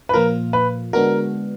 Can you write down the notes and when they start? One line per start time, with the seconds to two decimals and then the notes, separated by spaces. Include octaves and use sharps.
0.09 B4
0.13 A#2 F3 A#3 F4 A#4
0.53 B4
0.93 D3 G#3 B3 D4 F#4 A#4